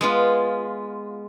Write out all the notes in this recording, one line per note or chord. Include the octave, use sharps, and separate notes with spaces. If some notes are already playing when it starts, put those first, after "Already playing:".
G#3 B3 F4